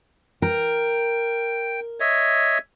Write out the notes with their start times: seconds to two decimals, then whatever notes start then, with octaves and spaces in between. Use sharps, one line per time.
0.42 A#4 G5
2.00 C#5 D#5 E5